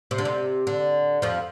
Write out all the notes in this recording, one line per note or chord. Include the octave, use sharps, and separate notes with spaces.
C3
D3
C3
D3
F2 F3